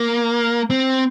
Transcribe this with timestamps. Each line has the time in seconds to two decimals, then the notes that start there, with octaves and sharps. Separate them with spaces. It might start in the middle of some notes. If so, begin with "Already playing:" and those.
Already playing: A#3
0.70 C4